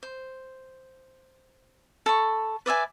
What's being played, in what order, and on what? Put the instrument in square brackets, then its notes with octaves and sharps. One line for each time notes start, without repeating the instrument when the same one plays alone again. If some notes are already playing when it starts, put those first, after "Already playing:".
[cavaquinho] C5
A4 B5 C#6
B4 D5 E5 G#5